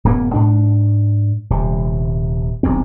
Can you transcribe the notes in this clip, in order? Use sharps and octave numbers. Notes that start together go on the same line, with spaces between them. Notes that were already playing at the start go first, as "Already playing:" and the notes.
D1 F#2 A#3 B3
G#2 D4
D#1 C3
D#1 B1 E2 C4